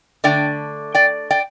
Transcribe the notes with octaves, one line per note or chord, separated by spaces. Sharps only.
D3 A3 D4 D5 G5
D5 G5
D5 G5